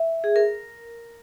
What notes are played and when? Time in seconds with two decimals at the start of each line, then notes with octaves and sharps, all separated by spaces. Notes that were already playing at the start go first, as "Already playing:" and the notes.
Already playing: E5
0.24 G#4
0.36 A#4